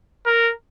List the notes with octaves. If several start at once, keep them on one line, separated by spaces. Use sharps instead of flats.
A#4